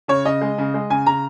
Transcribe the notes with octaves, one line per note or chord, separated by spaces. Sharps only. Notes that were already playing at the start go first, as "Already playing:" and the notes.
C#3 C#5
C#3 D#5
G#3
C#3
G#3
C#3 G#5
C#3 A#5